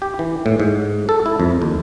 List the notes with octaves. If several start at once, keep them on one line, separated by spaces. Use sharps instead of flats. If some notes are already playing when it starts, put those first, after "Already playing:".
G4
E3
A2
G#2
A4
E4
F2
D#2